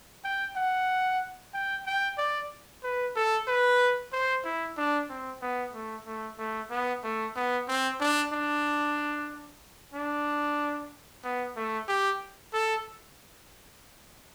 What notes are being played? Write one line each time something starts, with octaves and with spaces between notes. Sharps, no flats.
G5
F#5
G5
G5
D5
B4
A4
B4
C5
E4
D4
C4
B3
A3
A3
A3
B3
A3
B3
C4
D4
D4
D4
B3
A3
G4
A4